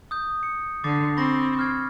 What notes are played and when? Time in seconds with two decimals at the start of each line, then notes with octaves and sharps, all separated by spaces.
0.11 D#6 G6
0.43 C#7
0.84 D3 D6 A6 C7
1.17 C4 B5 C#6 A#6
1.57 C#6 F6 G#6